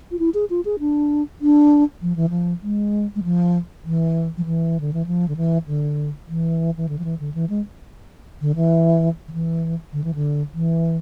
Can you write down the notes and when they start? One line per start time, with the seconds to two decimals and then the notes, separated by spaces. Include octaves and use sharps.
0.11 F4
0.19 E4
0.34 G#4
0.50 F4
0.65 G#4
0.80 D4
1.41 D4
2.02 F3
2.16 E3
2.29 F3
2.63 G#3
3.15 G#3
3.24 F3
3.85 E3
4.37 F3
4.45 E3
4.80 D3
4.93 E3
5.06 F3
5.28 D3
5.37 E3
5.67 D3
6.28 E3
6.77 E3
6.89 D3
6.99 F3
7.04 E3
7.20 D3
7.34 E3
7.49 G#3
8.41 D3
8.56 E3
9.28 D3
9.32 E3
9.92 D3
10.04 E3
10.15 D3
10.54 E3